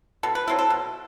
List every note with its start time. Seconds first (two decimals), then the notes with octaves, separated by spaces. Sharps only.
0.23 B2 A4
0.35 B4
0.48 F#3 C4 E4 A4
0.59 A4
0.70 B2